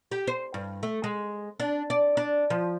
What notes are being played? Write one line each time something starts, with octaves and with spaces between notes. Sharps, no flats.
G4
C5
G2
A3
G#3
D4
D5
D4
F3